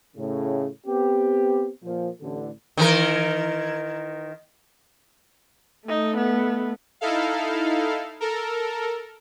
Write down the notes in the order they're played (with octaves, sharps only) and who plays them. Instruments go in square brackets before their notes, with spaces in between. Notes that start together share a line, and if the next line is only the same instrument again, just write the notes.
[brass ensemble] A2 C#3
B3 C4 G4
A#2 F3
A1 D3
[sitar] D#3 E3 A#4
[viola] A3 [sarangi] D#4
[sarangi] B3
[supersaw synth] D#4 E4 A4 F5
A4 A#4